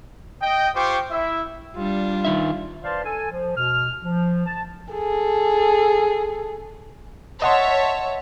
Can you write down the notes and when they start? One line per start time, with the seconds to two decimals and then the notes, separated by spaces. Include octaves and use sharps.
0.42 D#5 G5
0.75 F4 G4 C5 G5 C#6 D6
1.10 E4 E5
1.76 G3 D4 F4
2.25 D#3 D#4 E5
2.83 B4 C5 D5 F5 A5 C6
3.04 A4 G#5
3.30 F3
3.56 B2 F6
4.03 F3
4.46 A5
4.93 G#4 A4
7.42 C#5 D#5 E5 F#5 A5 C6